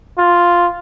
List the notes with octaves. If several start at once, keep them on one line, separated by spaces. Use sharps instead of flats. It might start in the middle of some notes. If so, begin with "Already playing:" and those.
F4